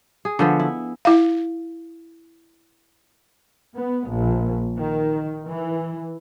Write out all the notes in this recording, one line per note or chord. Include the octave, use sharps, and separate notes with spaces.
G#4
D3 F3 B3
E4
E4 F5
B3
A#1
D#3
E3